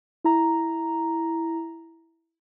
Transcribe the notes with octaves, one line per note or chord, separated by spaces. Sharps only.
E4 A#5